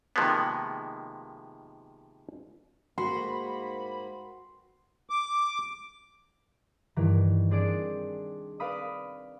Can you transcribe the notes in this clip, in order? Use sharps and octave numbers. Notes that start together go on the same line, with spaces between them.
C3 D#3 F3 G#3 A#3 B3
G#2 A#3 F#4 B5 C6
D6
G2 D#3 E3
C4 D4 G#4 D5 A6 D7
B4 D5 F5 B5 D#6